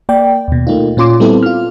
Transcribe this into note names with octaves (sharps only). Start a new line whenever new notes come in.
A#3 D5 G5
D#2 B2
A3 A#3 D#4 F4
A#2 C#4 F4 C6 D6
G3 B3 C4 E4 A4
F4 F6